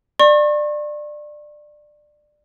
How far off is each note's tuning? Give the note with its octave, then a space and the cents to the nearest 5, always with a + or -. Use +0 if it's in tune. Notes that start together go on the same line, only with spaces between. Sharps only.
D5 +20 C#6 -40